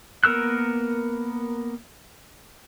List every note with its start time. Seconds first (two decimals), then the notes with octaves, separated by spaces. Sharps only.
0.24 A#3 B3 A#4 E6 F#6